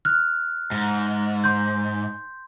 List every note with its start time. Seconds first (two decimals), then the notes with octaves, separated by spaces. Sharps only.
0.05 F6 F#6
0.72 G#2
1.44 C6 G6